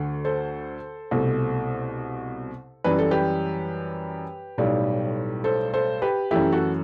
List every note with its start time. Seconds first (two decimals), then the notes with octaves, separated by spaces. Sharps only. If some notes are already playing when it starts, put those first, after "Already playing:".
Already playing: D2 D3 A3
0.25 A4 C5
1.11 C2 B2 A3
2.84 F#2 E3 G3 B4
2.98 A4
3.11 G4 B4
4.58 B1 A2 G3
5.44 A4 C5
5.73 A4 C5
6.02 G4 B4
6.31 F#2 E3 A3 E4 G4
6.52 F#4 A4